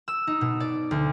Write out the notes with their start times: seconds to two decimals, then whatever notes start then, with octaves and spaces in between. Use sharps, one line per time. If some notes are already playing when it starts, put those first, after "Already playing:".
0.08 E6
0.27 D#4
0.41 B2
0.60 D5
0.91 D2